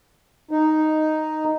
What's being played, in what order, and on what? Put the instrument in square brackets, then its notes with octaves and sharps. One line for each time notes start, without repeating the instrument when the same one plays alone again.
[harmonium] D#4